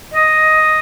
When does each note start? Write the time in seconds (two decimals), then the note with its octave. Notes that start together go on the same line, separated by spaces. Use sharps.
0.12 D#5